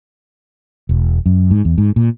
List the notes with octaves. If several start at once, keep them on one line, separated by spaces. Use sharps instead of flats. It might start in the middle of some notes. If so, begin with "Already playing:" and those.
E1
F#2
G#2
E2
G#2
A#2